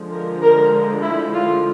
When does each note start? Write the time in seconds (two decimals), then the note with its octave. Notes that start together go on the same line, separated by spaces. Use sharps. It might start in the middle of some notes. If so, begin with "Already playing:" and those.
Already playing: D3 F3 G#3
0.11 A#4
0.42 A#4
1.03 E4
1.34 F4